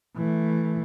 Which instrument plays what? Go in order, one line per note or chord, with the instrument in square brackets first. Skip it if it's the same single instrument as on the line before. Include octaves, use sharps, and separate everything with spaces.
[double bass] E3 A3